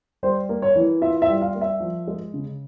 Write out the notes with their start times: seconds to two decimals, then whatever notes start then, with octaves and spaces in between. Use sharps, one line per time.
0.23 G3 C5
0.49 A#3
0.62 C#5
0.76 E3
1.01 F4 E5
1.22 E5
1.28 G3
1.41 F5
1.55 A#3
1.61 E5
1.80 F3
2.08 G#3
2.34 C#3